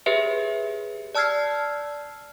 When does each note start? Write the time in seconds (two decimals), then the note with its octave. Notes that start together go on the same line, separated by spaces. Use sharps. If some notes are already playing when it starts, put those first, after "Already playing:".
0.06 G4 G#4 B4 C#5 E5
1.15 D5 A5 E6 F6 G#6 C7